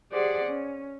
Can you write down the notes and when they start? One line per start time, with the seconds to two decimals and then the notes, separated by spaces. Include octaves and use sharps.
0.12 G4 G#4 C5 D5 F#5
0.45 C#4